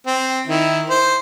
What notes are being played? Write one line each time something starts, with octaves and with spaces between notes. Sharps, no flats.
C4
D#3 E4
C5